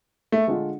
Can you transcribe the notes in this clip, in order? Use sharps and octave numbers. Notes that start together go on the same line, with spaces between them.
A3
D3 G#3 D4 F4